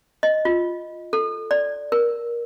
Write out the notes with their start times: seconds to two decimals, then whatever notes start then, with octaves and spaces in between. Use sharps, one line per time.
0.23 D#5
0.45 F4
1.13 A4
1.51 D5
1.92 A#4